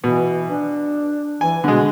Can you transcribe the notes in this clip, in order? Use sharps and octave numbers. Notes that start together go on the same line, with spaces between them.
B2 E3
D4
E3 G#5
B2 D3 G#3